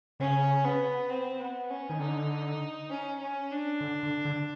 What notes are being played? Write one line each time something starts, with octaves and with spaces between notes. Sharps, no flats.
C#3 C#4
B3
C4
B3
C#4
D#3
D3 D#4
C#4
C#4
D4
D3
D3
D3